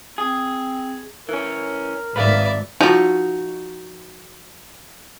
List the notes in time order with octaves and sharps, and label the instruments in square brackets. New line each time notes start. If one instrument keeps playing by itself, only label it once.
[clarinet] C4 [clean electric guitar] G#4
[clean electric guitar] E3 C#4 [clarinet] A#4
[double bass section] G#1 G#2 [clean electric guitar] B4 F5 [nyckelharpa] D5 E5
[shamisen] F3 [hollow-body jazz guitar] D#4 F#4